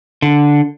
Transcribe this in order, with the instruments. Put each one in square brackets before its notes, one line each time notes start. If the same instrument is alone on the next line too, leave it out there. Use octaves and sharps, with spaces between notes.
[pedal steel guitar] D3